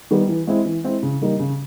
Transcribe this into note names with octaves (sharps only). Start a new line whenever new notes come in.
D#3 G3 B3
E3
G#3 C4 E4
E3
G#3 C4 E4
C#3
E3 G3 A#3 D#4
C#3